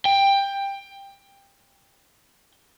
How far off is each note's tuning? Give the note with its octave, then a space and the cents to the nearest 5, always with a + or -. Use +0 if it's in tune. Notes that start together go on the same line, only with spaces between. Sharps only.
G5 +15